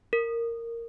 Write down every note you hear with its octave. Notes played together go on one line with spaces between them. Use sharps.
A#4